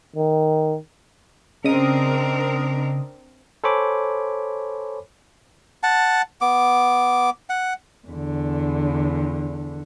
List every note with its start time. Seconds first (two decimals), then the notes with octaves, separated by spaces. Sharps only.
0.16 D#3
1.65 C#3 C4 D4 A#4 D#5 D#6
3.64 A4 C5 C#5 G#5 B5 D6
5.83 F#5 A5
6.41 B3 D6
7.50 F#5
8.08 E2 D3